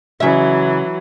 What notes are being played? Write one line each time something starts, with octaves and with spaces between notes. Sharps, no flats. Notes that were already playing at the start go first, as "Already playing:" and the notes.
C#3 E3 F#3 E5